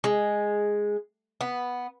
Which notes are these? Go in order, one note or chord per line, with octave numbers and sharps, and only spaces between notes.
G#3
B3